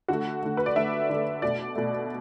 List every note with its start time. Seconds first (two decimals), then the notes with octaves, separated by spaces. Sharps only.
0.08 D3 A3 F#4
0.43 D3 A3
0.57 B4
0.66 D5
0.75 D3 A3 E5
1.09 D3 A3
1.42 B2 A3 D5
1.76 B2 A3